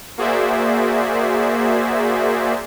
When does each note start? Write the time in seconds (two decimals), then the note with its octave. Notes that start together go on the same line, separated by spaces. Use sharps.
0.18 A#3 F#4 G#4 C5 D5 E5